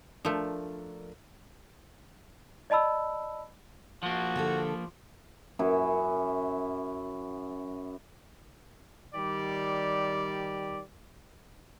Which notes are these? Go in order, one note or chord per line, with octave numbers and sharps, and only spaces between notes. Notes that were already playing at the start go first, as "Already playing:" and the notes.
F3 A3 D4 A#4
D5 D#5 A5 B5 E6
F3 A#3 F#4
D3 G4 A4
F#2 C#4 E4
D#3 G3 G4 D5